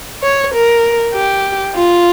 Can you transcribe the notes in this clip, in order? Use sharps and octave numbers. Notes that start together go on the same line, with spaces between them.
C#5
A#4
G4
F4